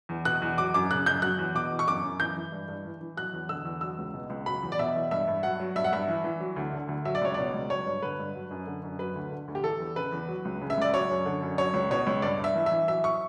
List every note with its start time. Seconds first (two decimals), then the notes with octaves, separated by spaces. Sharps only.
0.09 E2
0.25 B2 F#6
0.42 E2
0.58 F#3 D6
0.74 F#2 D6
0.91 C#3 F#6
1.06 F#2 G6
1.22 F#3 F#6
1.39 E2
1.55 B2 D6
1.71 E2
1.79 C#6
1.87 F#2 D6
2.04 F#2
2.20 E3 G6
2.36 E3
2.52 G2
2.68 G2
2.85 E3
3.01 E3
3.17 F#3 F#6
3.33 E2
3.49 D3 E6
3.65 E2
3.81 F#3 E6
3.98 C#2
4.14 B2
4.30 C#2
4.46 F#3 B5
4.62 E2
4.72 D5
4.79 B2 E5
4.95 E2
5.11 G2 E5
5.27 G2
5.43 F#3 F#5
5.60 F#3
5.75 G2 E5
5.84 F#5
5.92 G2 E5
6.08 E3
6.24 E3
6.40 F#3
6.56 D2
6.73 D3
6.88 D2
7.05 F#3 E5
7.15 D5
7.21 C#2 C#5
7.34 B2 D5
7.54 C#2
7.70 F#3 C#5
7.86 G2
8.02 D3 B4
8.19 G2
8.35 F#3
8.51 F#2
8.67 D3
8.83 F#2
8.99 F#3 B4
9.15 D2
9.31 D3
9.48 D2
9.55 G4
9.63 E3 A4
9.80 E2
9.96 C#3 B4
10.12 E2
10.29 F#3
10.45 C#2
10.62 C#3
10.70 E5
10.77 C#2 D5
10.94 F#3 C#5
11.10 F#2
11.26 D3
11.42 F#2
11.58 F#3 C#5
11.74 C#2
11.91 B2 C#5
12.07 C#2
12.22 G2 D5
12.39 G2
12.44 E5
12.55 E3
12.66 E3 E5
12.88 F#3 E5
13.04 C#6